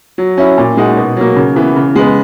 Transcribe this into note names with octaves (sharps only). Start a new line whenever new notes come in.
F#3
C#4 E4
A#2
G#3 D#4 F#4
B2
F#3 A#3
C#3
E3 B3
C#3
G#3 B3